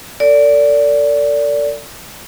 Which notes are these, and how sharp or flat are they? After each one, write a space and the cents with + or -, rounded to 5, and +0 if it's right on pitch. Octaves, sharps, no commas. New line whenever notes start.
A4 +45 D5 -20